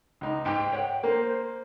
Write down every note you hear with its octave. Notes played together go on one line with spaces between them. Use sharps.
C#2 D#4
G#2 G5
C#5 F#5
A#3 C5